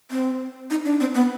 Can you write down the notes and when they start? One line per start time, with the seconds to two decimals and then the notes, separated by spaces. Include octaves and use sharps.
0.11 C4
0.70 D#4
0.85 D4
1.00 C4
1.15 B3